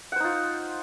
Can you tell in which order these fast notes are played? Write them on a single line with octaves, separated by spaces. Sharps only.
F#5 C5 D#4 F4